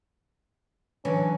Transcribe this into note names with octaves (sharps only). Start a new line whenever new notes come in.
D3 E3 F#3 C#4